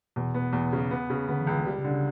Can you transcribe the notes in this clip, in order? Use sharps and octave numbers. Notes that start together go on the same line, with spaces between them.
E2 B2
B3
E2
C#3
B3
C#3
D3 B3
E3
C#2
D3
C#3 G3
C#3
D3
C#3